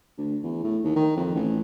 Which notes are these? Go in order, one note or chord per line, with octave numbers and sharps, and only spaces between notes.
D2
E2
A2
D#2
D#3
F2
A1